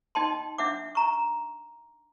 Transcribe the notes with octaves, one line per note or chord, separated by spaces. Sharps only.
D#4 D#5 G5 A5 C6
D4 E5 F#5 D6
A#5 C#6